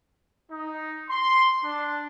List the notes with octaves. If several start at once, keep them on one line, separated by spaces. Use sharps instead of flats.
D#4
C6
D4